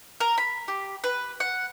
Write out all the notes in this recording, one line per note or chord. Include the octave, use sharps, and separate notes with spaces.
A#4
B5
G4
B4
F#5